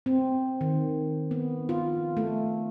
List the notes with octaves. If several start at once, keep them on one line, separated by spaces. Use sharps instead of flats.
C4
D#3
B3
F4
A3